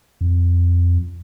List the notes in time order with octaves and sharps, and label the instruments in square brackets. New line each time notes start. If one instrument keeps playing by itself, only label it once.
[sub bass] F2